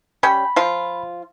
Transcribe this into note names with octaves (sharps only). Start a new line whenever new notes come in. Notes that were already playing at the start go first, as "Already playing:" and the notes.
G3 C#4 G5 B5
F3 F4